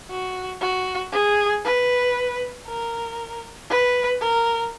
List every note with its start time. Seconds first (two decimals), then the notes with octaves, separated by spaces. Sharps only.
0.10 F#4
0.61 F#4
1.12 G#4
1.65 B4
2.66 A#4
3.70 B4
4.21 A#4